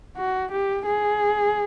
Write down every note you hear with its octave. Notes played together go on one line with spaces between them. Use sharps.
F#4
G4
G#4